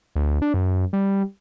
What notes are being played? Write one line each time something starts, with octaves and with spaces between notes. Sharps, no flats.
D2
D4
F#2
G3